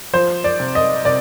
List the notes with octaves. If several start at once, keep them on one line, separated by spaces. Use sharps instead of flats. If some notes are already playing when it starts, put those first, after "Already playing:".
F3 C5
D5
C3
D#5
C3 D5